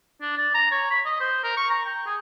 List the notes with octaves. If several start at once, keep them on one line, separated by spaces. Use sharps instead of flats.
D4
D5
A#5
C#5
B5
D#5
C5
A#4
C#6
A#5
G5
G#4